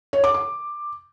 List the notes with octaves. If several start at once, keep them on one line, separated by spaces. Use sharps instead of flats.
C#5
D6
D6